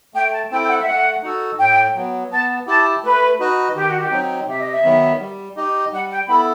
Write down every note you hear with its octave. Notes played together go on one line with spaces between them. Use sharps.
A3 G5
A5
C4 E4 A4 G5
G5
F#5
E5
A3 F#5
D#4 F#4 A4
A2 G5
F#3 B3
B3 A5
E4 G4 A5
A3 B4
D#4 F#4 B4 D#5
D#3 G4
F#4
G4
F#3 C4 D#4
C3 E5
D#5
E5
D#3 F#3 B3
G3
D#4 G4 D#5
G3 F#5
G5
B3 E4 A4 B5